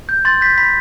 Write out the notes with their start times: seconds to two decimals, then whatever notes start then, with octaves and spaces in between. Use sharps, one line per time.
0.09 G6
0.25 C6 A6
0.41 G6 B6
0.58 B5 B6